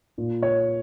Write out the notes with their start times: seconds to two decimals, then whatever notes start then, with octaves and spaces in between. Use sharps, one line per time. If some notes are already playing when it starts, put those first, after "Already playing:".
0.18 A#2
0.43 C#5